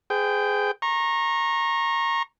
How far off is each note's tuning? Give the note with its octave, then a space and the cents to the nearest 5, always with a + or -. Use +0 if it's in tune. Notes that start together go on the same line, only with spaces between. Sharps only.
G#4 +0 C5 -45 G5 +0
A#5 +0 C#6 -35